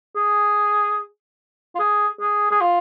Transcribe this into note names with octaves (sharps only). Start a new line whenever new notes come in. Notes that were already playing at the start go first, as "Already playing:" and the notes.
G#4
F4
G#4
G#4
G#4
F4